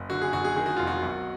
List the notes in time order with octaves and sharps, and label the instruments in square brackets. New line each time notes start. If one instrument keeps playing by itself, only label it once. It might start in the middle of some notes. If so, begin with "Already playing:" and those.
Already playing: [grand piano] F#1
D3 F#4
G#4
F#1 F#4
G#4
D#3 G#4
F#4
F1 F4
F#4
B1